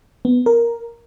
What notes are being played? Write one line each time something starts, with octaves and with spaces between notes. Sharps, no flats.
B3
A#4